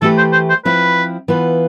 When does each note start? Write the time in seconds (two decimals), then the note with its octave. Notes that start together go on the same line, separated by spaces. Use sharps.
0.02 E3 A3 E4 G4 A4 B4
0.18 C5
0.33 C5
0.50 C5
0.65 F3 C4 E4 B4
1.28 E3 B3 F4 B4